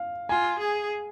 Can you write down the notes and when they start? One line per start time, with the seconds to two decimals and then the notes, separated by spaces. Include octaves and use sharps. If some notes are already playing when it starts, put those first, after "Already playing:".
Already playing: F5
0.29 F4 G#5
0.60 G#4